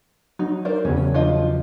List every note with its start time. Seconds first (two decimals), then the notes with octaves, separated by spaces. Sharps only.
0.39 F#3 D#4
0.65 A#4 C5 D5
0.85 E2 C#3 F#3 C#4
1.14 F3 F4 D#5